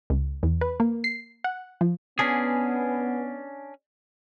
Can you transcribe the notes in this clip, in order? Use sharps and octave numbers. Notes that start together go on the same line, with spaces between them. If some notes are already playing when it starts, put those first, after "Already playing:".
C#2
E2
B4
A#3
C7
F#5
F3
B3 C#4 D4 G#4